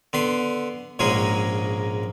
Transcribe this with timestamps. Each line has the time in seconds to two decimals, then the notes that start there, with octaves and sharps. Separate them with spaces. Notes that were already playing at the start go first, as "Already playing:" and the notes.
0.13 D3 B3 C6
0.99 A#1 G#2 C#3 G#3 A#3 G#4